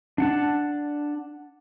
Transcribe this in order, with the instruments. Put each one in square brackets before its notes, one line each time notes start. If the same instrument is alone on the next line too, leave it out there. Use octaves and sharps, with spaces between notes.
[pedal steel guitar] D4 F#5 A5